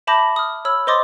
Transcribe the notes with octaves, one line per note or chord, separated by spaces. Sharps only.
E5 A5 B5 D6 G6 A#6
D#6 F6
C#5 B5 E6 F6
C5 D#5 C6 D6 D#6 A6